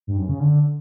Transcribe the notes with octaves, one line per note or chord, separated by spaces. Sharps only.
G2
F#2
C#3
D3